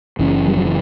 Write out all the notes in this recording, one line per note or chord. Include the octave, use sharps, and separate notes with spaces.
F#1 F#2 C#3 E3
G3
F#3
E3